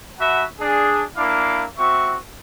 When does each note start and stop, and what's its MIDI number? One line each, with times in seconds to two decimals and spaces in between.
0.19 0.44 66
0.19 0.44 76
0.19 0.44 78
0.19 0.44 81
0.19 0.44 83
0.60 1.03 62
0.60 1.03 68
1.17 1.64 58
1.17 1.64 62
1.17 1.64 64
1.17 1.64 77
1.17 1.64 86
1.78 2.16 60
1.78 2.16 66
1.78 2.16 76
1.78 2.16 85